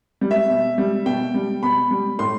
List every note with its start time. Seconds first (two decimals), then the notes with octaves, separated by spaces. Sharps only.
0.21 G3
0.31 E5
0.50 B2
0.78 G3
1.06 B2 G5
1.34 G3
1.62 B2 B5
1.91 G3
2.19 A2 C6